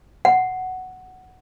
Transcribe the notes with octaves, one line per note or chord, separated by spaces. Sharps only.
F#5